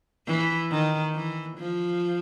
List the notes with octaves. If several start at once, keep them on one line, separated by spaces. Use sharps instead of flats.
E3
D#3
E3
F3